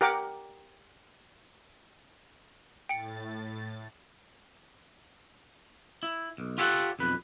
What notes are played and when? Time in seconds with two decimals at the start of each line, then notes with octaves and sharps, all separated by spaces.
0.01 G4 A#4 F#5 D6
2.89 A2 G5 A6 C#7
6.03 E4
6.38 B1
6.58 F4 G4 A4 C#5 F5 F#5
6.99 B1 F2 B4